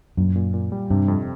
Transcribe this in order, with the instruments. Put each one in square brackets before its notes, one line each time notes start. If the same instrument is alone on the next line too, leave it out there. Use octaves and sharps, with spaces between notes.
[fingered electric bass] F#2 [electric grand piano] A#2
[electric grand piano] A#2
A#2
G3
[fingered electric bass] G2 [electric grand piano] C3
[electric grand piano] F2